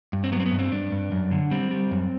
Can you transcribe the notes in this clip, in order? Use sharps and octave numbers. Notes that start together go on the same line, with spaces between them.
G2
C4
F#3 B3
C4
B3
G2
C4
G2 D4
G2
F#2
D3
G3 C4
G3
F#2